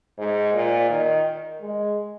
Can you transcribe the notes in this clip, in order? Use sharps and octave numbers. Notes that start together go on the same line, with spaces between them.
G#2
A#2
D#3
G#3